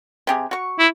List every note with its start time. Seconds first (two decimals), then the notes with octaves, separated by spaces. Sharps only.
0.27 C3 G4 G#4
0.51 F#4 C#6
0.79 E4